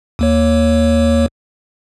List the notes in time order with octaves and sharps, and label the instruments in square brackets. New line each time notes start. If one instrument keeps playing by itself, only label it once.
[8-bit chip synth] D#2 A#3 C#5